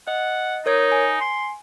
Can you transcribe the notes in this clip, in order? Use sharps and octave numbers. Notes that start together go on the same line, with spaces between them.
D#5 F#5
D#4 A#4 C#5 G#6
G#5
C6